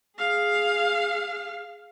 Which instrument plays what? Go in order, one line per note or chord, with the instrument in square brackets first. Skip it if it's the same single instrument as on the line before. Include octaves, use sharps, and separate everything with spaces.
[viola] G#4 F5